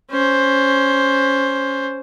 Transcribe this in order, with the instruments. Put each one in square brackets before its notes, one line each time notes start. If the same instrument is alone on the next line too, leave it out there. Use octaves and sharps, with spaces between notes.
[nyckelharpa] C#4 C5